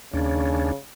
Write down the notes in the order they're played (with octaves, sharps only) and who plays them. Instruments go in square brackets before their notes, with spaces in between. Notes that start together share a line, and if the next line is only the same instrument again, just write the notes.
[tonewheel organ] D#2 C#4 D4 [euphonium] C#3